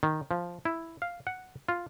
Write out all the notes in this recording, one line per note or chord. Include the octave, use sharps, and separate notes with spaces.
D#3
F3
E4
F5
F#5
F4